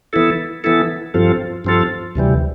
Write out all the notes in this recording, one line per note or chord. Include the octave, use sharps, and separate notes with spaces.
E3 B3 E4 A4
E3 B3 E4 A4
G2 F3 C4 F4 A4
G2 F3 C4 F4 A4
D2 C3 E3 G3